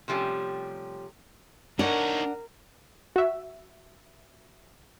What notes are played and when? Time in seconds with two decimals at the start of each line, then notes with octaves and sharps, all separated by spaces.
0.08 C3 F3 G3 A3 C#4
1.79 D4 D#4 A#4 C#5 F#5
3.16 F#4 E5